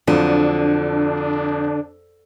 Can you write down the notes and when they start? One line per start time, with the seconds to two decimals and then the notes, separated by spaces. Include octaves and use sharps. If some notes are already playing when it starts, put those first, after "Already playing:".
0.07 F2 D3 F#3 D4